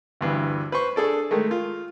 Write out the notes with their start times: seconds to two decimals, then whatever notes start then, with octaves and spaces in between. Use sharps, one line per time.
0.21 D2 G2 E3
0.72 B4 C5 C#6
0.96 D4 G#4 A4 D5
1.31 D#3 G#3 A3
1.51 F4